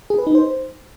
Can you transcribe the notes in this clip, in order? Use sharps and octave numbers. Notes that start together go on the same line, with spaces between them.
G#4
B4
D#4
C5